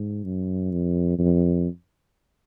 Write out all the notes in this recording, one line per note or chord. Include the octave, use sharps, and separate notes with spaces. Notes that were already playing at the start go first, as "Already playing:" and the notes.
Already playing: G#2
F#2
F2
F2